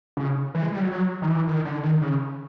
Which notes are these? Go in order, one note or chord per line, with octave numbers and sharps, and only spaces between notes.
C#3
E3
G#3
G3
F#3
F#3
D#3
E3
D#3
D3
D#3
C#3